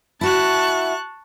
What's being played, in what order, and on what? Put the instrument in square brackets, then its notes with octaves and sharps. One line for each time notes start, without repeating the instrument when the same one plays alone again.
[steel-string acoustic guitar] E4 F#4 [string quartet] A5 C#6 F#6